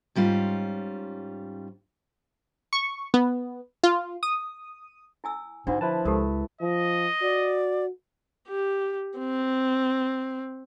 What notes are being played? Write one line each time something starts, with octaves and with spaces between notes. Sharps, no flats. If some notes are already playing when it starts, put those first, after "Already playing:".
G#2 G3 C#4 F4
C#6
B3
F4
D#6
E4 G#5 E6
G#2 D3 D4 F4 F#4
F3 E4 B4 A5
C#2 G4 A4 A#4
F3 D#5
F#4 D5
G4
C4